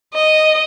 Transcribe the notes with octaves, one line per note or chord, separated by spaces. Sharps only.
D#5